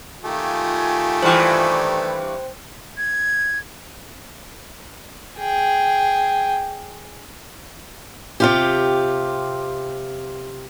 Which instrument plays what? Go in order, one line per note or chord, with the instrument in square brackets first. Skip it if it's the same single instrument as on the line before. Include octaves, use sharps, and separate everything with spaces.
[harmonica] D#3 A3 G4 [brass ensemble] F4 G#5
[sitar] G2 E3 [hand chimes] C5 G5
[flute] G#6
[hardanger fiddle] G#4 G5
[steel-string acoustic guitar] C3 F4 G4